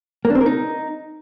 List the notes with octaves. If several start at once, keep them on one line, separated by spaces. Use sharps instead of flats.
A#3
D4
C4
A#4
D#4